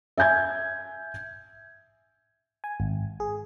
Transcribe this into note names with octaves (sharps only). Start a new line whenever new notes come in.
E5 G#5 G6 G#6
G#5
G#1
G#4